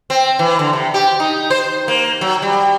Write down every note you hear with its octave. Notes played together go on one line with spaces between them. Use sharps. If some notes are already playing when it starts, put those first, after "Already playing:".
C4
E3
D3
C3
G4
D#4
C5
A#3
F#3
G3